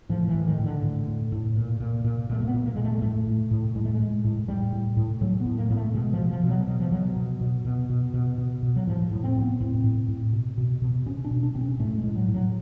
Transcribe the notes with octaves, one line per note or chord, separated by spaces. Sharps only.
A2 F3
E3
A2
D#3
A2
D3
A2
A2
A2
A#2
A#2
A#2
A#2 A3
A#3
B3
A#2
A#3
A#2 G#3
A3
G#3
A2 A3
A2
A2
A2 G#3
A3
G#3
A2
A2
A2 G3
A2
A2
A2 F#3
B3
A2
A#3
A2 A#3
A3
B2 G#3
F3
B2
F3
B2
F#3
B2 F#3
F3
B2 F#3
B2
B2
B2
B2
B2
B2
B2
F#3
A2 F3
A2
C4
A2
B3
A2 C4
A2
A2
B2
B2
B2
B2 C#4
D4
B2
D4
B2 C4
C#4
A2 A3
G#3
A2
F#3
A2
F#3